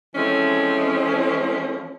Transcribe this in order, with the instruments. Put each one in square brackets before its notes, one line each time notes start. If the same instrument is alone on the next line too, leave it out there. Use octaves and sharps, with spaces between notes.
[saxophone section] E3 F3 G#3 A3 C4 C#4